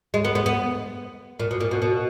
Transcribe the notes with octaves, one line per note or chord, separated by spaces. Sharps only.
G#3
B3
B3
B3
A#2
B2
A#2
B2
B2